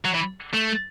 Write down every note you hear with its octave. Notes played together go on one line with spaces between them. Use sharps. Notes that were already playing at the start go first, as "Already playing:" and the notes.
F#3
E3
A3